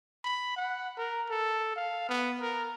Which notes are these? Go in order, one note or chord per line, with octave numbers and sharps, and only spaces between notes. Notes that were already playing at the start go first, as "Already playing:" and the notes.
B5
F#5
A#4
A4
F5
B3
A#4